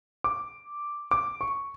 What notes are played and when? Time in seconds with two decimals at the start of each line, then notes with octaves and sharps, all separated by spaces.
0.24 D6
1.11 D6
1.41 C#6